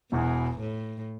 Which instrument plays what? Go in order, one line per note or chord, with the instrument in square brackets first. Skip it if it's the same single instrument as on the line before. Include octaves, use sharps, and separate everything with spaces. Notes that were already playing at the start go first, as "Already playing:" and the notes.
[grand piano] E1 E2 E3 [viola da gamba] B2
[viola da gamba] A2